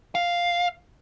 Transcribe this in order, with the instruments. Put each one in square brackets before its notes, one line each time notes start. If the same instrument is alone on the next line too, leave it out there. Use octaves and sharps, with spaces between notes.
[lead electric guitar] F5